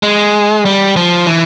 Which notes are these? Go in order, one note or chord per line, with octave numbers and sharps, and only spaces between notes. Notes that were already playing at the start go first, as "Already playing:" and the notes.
G#3
G3
F3
E3